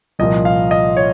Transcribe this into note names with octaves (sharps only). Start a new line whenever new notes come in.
C2 A#2 F3 D#5
F5
D#5
C#5